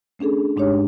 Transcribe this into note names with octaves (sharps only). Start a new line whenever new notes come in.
A3 C#4 D4 G#4 A4
G#2 G#3 D4 D#4 G4 C#5